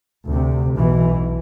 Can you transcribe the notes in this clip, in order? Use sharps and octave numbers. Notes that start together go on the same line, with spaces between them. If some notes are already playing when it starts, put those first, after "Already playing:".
D2 C3
B1 B2 E3